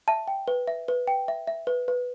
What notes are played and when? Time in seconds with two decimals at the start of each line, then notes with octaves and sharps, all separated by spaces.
0.08 E5 A5
0.28 G5
0.48 B4
0.68 E5
0.88 B4
1.07 G5
1.28 E5
1.47 E5
1.67 B4
1.88 B4